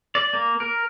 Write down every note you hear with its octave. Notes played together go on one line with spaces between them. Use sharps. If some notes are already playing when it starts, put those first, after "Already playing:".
D5
A#3
A#4